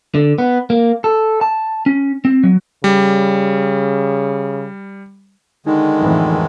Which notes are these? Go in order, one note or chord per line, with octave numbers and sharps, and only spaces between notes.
D3
B3
A#3
A4
A5
C#4
C4
F#3
C#3 G3
D3 D#3 G#3 D#4
F2 A2 E3